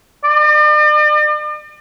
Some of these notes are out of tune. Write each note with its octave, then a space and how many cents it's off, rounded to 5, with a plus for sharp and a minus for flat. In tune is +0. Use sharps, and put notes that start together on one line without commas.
D5 +45